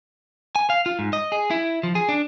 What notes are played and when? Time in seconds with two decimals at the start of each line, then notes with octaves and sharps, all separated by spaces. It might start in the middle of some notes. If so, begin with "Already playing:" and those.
0.56 G#5
0.70 F5
0.86 F4
0.99 G#2
1.13 D#5
1.32 G#4
1.51 E4
1.83 F3
1.95 G#4
2.09 D4